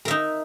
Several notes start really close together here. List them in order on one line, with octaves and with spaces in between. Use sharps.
A#4 E5 D#4